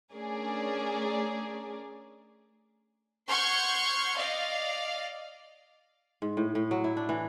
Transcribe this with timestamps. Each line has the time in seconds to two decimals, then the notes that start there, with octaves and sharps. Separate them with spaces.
0.13 A3 C#4 D4 G#4 A#4 D5
3.29 F#5 C6 C#6 F6 G6 G#6
4.16 D5 D#5 F5
6.22 G#2
6.37 A2
6.55 A2
6.71 F#3
6.84 E4
6.97 D4
7.09 E3